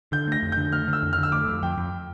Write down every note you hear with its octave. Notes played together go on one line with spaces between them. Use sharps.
D3 G6
A3 A#6
F2
D3 G6
A3 F6
D3
E6
F2
F6
D3
E6
A3 D6
F2
F2 G5
F2